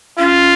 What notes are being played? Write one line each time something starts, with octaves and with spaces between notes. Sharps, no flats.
C#4 F4